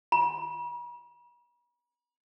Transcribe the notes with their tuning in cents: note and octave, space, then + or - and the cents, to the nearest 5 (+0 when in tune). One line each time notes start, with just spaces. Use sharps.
B5 -45